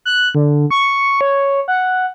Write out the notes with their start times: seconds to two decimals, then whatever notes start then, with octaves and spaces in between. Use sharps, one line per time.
0.05 F#6
0.35 D3
0.71 C#6
1.21 C#5
1.68 F#5